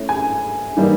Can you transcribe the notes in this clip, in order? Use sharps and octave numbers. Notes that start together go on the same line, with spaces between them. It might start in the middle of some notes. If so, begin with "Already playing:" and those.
Already playing: A3 C#4 E4
G#5
E3 G3 A#3 D#4